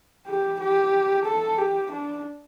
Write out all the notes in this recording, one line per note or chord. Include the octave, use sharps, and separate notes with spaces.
G4
G4
A4
G4
D4